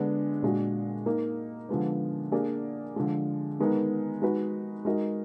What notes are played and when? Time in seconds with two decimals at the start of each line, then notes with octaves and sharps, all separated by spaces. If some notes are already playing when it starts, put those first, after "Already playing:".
Already playing: D3 G#3 B3 D4 G#4
0.42 A#2 G#3 D4 F#4
1.05 A#3 D#4 A#4
1.69 D3 F3 G#3 B3
2.32 A#3 D4 G#4 D5
2.96 D3 F3 G#3
3.59 D#3 G#3 B3 D#4 A#4
4.22 G#3 D#4 F#4 B4
4.85 G#3 D#4 F#4 A#4 D#5